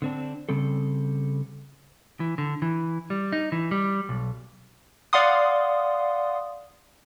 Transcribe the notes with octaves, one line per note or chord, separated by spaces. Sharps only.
D3 C4 D4
C#3 G3 C4 A4
E3
D3
E3
G3
D#4
E3
G3
B1
D5 F5 F#5 C6 D#6